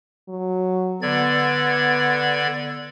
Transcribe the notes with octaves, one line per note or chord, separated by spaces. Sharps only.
F#3
D3 B3 D5 G#6